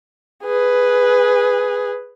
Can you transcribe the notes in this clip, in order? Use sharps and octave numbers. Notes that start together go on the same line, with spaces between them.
G#4 B4